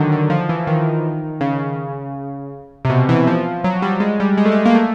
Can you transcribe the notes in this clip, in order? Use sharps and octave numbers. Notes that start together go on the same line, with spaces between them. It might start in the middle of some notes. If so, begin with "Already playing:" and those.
Already playing: D3 D#3 F#3
D3
F3
E3
D#3
C#3
C3
B2
E3
F3
F#3
G3
G#3
G3
G#3
A3
G#3
A#3
A3